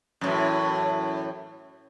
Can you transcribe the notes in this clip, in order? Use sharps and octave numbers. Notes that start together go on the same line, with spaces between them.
F#2 A2 E3